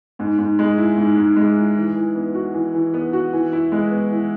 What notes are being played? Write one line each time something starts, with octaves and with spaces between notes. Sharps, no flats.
G#2
G#2
G#3
E4
G#2
G#2
G#3
E4
E3
E3
B3
F#4
E3
E3
B3
F#4
E3
E4
G#3
B3
E3